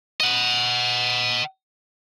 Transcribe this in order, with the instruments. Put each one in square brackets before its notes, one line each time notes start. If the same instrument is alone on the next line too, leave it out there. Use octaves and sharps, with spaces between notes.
[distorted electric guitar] D#5 F#5